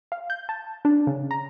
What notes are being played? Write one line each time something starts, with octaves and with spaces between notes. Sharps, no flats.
F5
G6
A5
D4
C#3
A#5